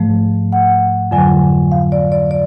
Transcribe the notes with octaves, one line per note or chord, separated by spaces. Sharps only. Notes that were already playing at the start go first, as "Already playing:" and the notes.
Already playing: G#2 F3 A3
F#5
F2 D3 F#3 G#5
F5
D5
D5
D5